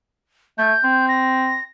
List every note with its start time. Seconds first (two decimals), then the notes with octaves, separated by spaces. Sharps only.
0.58 A3 G6
0.84 C4
1.09 A#6